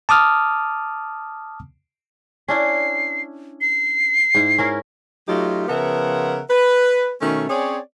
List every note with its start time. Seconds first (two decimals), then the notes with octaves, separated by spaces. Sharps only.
0.09 A5 D6 D#6 F6
2.48 C#4 D4 E4 C7
3.61 C7
4.35 G#2 E4
4.58 C#4 E4 A#4
5.28 F#3 A3 D#4 F4 G4
5.68 C#3 F3 B3 A#4 E5 F#5
6.50 B4
7.22 B2 D#3 A3 C#4
7.49 C4 C#4 G#4 C#5 D5